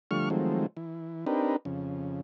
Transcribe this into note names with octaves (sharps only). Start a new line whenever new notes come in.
D3 F3 G3 A3 C#6 F6
D#3 F3 F#3 G#3 A3 C4
E3
C4 D4 D#4 G4 A#4 B4
F2 C#3